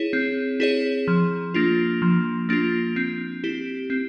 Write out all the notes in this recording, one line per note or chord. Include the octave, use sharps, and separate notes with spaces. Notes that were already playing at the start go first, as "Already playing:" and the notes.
Already playing: E4 G#4 C#5
C4
E4 G#4 C#5
F3
A#3 D4 F4
F3
A#3 D4 F4
C4
E4 G4
C4